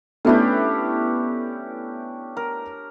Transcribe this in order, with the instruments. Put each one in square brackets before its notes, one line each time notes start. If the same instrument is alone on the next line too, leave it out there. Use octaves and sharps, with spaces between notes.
[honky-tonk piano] A3 B3 E4 [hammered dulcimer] C#4 D4 G4
[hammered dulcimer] A#4